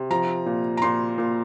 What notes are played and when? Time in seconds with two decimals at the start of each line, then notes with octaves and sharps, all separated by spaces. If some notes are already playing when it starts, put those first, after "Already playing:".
Already playing: C3
0.10 F3 A#5
0.46 A#2
0.77 A#5
0.82 A#2 C6
1.18 A#2